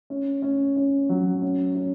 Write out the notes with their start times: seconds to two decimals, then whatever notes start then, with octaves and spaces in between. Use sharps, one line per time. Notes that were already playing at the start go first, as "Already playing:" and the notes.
0.10 C#4
0.42 C#4
0.76 C#4
1.09 F#3
1.42 C#4
1.75 C#4